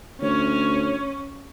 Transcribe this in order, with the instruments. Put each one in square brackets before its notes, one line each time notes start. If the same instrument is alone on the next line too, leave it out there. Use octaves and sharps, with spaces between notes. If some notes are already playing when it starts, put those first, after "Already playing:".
[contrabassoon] D2 [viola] C#4 [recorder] C#5